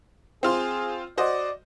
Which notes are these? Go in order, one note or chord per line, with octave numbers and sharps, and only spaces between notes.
C4 F4 G#4 C6
F#4 C5 D5 D#5